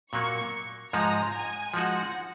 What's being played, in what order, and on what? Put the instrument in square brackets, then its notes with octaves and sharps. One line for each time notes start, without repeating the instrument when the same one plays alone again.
[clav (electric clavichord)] A#2 F#3 A#3 [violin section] C#6
[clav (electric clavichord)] G#2 F3 G#3 D#4 [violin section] A#5
[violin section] G#5
[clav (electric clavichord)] F3 G#3 D#4 F#4 [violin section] F#5